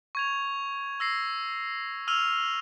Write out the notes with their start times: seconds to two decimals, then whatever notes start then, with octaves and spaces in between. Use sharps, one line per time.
0.15 C#6 G#6 F7
1.00 E6 A#6 C7
2.08 E6 F6 D#7 F7